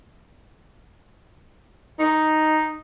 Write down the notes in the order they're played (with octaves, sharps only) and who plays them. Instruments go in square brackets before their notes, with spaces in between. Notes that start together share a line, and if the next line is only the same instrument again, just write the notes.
[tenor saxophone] D#4